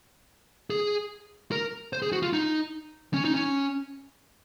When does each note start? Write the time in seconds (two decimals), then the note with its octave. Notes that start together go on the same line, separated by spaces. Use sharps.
0.70 G#4
1.52 A#4
1.93 C5
2.02 G#4
2.12 F#4
2.22 F4
2.33 D#4
3.14 C#4
3.25 D#4
3.35 C#4